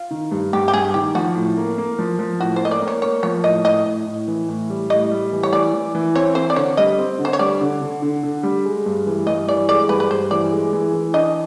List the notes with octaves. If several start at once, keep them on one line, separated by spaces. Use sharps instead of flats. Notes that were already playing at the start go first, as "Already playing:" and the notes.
Already playing: F4
D#3
G2
G2 G4
G4
G2 G#4
D#3 G4
F3 F#4
A2
A#3
A#3
F3
F3
A2 F#4
C5
A#3 D#5
D5
A#3
C#5
A#3 C#5
F3 C#5
A2 D#5
A2 D#5
A2
A2
E3
A2
G3
A2 D#5
G3
E3
C#5
E3 D5
E3
E3
C4 C#5
C4 C5
D5
D3 C#5
G3 D#5
C4
D3
C5
C#5
G3 D5
D3
D3
D3
D3
G3
G#3
G2
E3
G2 D#5
E3 D5
G#3 D5
G2 B4
B4
G2 C5
E3 D5
G#3
E3
E3
D4 D#5